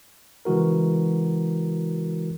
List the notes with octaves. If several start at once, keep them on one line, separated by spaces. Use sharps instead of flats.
C#3 E3 G#3 F#4 A#4